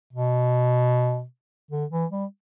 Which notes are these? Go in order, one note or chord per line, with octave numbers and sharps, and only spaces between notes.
B2
D3
E3
G3